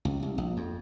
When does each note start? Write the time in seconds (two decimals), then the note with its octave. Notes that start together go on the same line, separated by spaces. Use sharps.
0.05 C#2
0.23 C2
0.38 A#1
0.57 F2